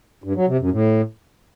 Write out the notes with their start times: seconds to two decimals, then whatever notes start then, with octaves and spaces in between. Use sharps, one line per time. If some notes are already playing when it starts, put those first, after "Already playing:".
0.24 G2
0.36 F#3
0.48 C3
0.59 F#2
0.71 A2